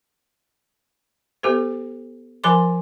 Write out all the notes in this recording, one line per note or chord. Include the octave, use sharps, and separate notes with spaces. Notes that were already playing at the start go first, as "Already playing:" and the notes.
B3 G4 A4 C5
F3 A#4 G#5 B5 C6 D6